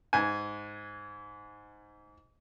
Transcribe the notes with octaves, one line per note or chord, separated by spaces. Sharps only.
G#2 G#5